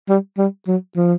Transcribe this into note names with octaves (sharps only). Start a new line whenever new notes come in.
G3
G3
F#3
F3